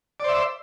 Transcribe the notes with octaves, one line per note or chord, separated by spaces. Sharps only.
C5 D5 E5